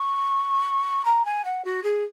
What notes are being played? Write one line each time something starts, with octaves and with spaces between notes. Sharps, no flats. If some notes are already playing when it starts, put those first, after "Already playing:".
Already playing: C#6
A#5
G#5
F#5
F#4
G#4